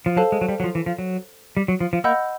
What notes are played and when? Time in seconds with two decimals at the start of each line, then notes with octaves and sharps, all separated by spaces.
0.06 F3
0.16 F#3 A4 C5 F5 A5
0.32 G#3
0.41 F#3
0.49 G3
0.60 F#3
0.64 F3
0.75 E3
0.86 F3
0.99 F#3
1.57 G3
1.68 F#3
1.80 F3
1.93 F3
2.04 A#3 D#5 F#5 B5 E6 G6